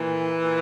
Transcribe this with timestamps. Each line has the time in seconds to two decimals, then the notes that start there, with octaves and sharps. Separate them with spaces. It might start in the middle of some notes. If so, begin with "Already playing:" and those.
Already playing: A#2 E3
0.44 A#2